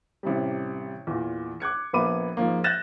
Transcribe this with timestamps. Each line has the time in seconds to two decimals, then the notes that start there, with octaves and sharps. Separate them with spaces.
0.23 A1 C3 G3
1.07 E2 A#2
1.60 D6 F#6 G#6 C#7
1.93 A#1 A#3 B3 B5 D6 D#7
2.37 G#2 F3 A#3
2.64 F#6 G6 A6 A#6 E7